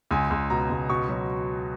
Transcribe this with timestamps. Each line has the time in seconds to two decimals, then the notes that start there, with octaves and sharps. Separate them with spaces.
0.11 C#2 G#5
0.30 C#2
0.50 B2 A#5
0.70 C#2
0.90 B2 C#6
1.09 F#3